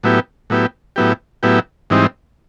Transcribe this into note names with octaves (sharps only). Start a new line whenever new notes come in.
A2 F#3 B3 E4 G4
A2 F#3 B3 E4 G4
A2 F#3 B3 E4 G4
A2 F#3 B3 E4 G4
G#2 E3 G3 C4 D#4